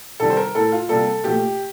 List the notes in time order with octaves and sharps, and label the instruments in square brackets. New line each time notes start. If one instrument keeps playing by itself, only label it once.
[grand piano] C3 D#3 G3 A4
C5
A#4
A2 A3 A4
F4
C3 G3 A#3 A4
A#2 F3 A3 G4